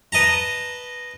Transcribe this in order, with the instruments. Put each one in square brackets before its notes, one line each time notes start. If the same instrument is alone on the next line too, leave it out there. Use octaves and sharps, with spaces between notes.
[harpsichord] B4 D#5 A5 A#5